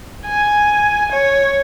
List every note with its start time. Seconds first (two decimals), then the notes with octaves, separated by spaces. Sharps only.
0.27 G#5
1.12 C#5